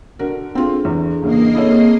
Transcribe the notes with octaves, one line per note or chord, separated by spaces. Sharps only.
D3 F#4 A#4
C4 D4 F4 G#4 A4
E2
E2 C#3 A#3 D#5 C7
C4 E4 G#4 A4 C#5